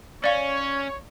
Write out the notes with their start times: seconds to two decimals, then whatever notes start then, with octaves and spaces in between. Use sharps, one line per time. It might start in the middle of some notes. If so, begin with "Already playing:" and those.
0.24 C#4 C#5 D5 F5